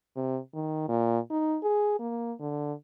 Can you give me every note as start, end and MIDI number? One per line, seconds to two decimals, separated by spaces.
0.16 0.39 48
0.54 0.86 51
0.89 1.19 46
1.31 1.58 63
1.63 1.97 68
1.99 2.33 58
2.40 2.73 50